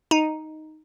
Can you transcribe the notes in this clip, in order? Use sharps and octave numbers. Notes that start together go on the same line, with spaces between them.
D#4